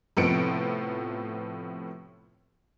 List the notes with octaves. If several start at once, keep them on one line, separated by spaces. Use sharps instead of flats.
A2 C3 F3 B3 C#7 D7